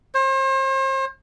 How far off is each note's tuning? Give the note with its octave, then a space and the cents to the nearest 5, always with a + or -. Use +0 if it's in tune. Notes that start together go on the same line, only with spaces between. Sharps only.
C5 +40